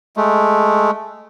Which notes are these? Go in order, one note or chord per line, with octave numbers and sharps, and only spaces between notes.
G#3 A3